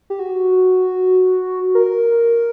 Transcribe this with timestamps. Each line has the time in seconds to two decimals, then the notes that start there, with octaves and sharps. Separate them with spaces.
0.10 G4
0.19 F#4
1.75 A#4